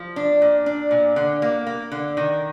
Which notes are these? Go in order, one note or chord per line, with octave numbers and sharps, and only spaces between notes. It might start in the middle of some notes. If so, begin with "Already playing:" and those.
Already playing: F3
D4
A#2
D4
A#2
D3
A#3
A#3
D3
D#3